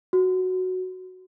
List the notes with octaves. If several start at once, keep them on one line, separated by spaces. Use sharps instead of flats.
F#4